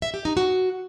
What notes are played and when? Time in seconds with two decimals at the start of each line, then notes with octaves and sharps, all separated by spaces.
0.02 E5
0.14 G4
0.25 D#4
0.37 F#4